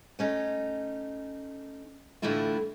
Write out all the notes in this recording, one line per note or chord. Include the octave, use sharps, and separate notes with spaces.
A3 C#4 D#4
A2 D3 E3 A3 E4 F4